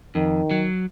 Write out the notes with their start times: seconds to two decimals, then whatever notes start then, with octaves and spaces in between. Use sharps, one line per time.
0.15 F2 D#3
0.51 F#3